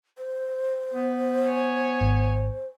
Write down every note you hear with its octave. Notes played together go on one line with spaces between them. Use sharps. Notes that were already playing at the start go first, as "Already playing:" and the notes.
C5
B3
C#5 G#5
G#1